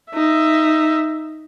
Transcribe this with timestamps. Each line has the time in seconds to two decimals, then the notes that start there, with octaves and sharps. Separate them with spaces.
0.13 D#4 E5